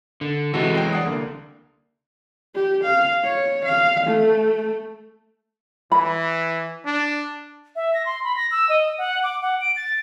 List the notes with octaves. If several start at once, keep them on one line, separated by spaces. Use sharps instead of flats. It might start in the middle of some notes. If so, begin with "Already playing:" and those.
D3
C3 E3 G#3 F#4 A4
F#3 G5 C7
D5 F#5 D#6
C2 D3 A#3
G4
F5
C#5
F5
A3
E3 B5
D4
E5
A#6
C6
B5
A#6
E6
D#5
F#5
D6
F#5
D7
A6